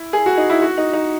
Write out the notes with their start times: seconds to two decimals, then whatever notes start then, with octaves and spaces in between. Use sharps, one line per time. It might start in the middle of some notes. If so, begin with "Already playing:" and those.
Already playing: E4
0.13 G#4
0.26 F#4
0.37 D#4
0.50 E4
0.62 F#4
0.78 D#4
0.93 D#4